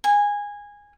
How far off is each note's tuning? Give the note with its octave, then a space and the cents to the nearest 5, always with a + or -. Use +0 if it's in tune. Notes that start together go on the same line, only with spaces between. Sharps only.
G#5 -15